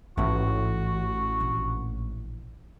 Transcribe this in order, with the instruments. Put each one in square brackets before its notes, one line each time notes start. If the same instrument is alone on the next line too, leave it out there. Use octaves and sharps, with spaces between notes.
[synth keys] A1 [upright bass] G#2 E3 [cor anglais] F#4
[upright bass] A#1